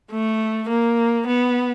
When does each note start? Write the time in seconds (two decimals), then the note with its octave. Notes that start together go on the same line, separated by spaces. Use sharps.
0.11 A3
0.69 A#3
1.27 B3